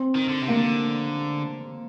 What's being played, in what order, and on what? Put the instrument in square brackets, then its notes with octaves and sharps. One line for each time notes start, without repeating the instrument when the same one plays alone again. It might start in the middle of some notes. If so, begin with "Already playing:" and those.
Already playing: [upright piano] C4
[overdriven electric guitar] D#3
D3
C3
[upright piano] A#3
[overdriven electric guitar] D3